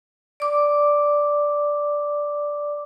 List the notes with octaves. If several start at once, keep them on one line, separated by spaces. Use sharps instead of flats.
D5 D6